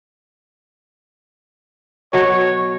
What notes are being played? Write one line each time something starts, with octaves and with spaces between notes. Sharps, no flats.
B2 F#3 C#5